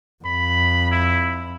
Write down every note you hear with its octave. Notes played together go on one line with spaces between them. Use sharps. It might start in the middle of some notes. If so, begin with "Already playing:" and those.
F2 B5
E4